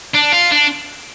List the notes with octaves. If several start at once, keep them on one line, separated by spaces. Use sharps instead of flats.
D4
F4
D4